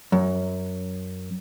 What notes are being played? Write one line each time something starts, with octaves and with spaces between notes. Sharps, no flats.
F#2